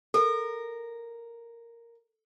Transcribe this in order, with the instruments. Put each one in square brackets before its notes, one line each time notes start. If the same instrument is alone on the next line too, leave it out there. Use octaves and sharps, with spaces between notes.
[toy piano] A4 [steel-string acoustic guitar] A#4